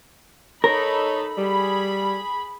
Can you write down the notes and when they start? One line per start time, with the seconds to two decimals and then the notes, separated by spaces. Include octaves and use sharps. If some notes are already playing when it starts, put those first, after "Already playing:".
0.64 D#4 A4 A#4 C#5 B5
1.37 G3 G#4 B5